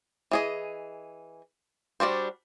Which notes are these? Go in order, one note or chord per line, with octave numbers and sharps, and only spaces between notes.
E3 G#4 D#5
G3 D4 F#4 C5